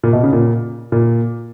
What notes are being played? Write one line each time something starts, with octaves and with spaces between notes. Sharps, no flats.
A#2
B2
C#3
A#2
A#2